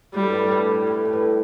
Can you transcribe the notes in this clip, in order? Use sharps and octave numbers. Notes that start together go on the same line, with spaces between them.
A2 G3
G2
A2
G2
A2
A2
G2
A2